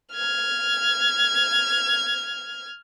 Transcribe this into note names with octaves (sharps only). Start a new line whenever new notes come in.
F6 G#6